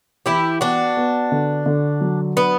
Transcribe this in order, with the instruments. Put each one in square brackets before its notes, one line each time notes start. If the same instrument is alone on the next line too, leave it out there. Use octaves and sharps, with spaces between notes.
[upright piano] E3 [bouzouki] E4 G4
[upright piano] B3 [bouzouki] D4 F#4
[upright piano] B3
D3
D3
F#3
[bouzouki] B3 [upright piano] D4